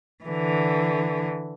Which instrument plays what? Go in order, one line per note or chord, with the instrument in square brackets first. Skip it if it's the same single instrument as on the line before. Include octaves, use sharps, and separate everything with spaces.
[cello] D3 E3